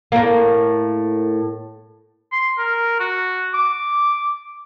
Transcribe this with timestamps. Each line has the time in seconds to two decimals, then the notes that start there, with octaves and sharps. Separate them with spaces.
0.12 A2 A#3
2.32 C6
2.58 A#4
2.99 F#4
3.54 D6